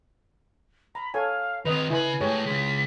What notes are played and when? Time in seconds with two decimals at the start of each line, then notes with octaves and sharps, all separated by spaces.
0.95 A#5 B5
1.14 A4 C#5 F5 G#5
1.65 D#3 C4 B4 D#5 F7
1.90 C#3 E4 B4 G#5 B5
2.20 G#2 A3 G4 G#4 C#5
2.46 C#3 G#3 B6